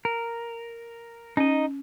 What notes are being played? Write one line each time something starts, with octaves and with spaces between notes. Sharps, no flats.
A#4
C#4 D#4 D#5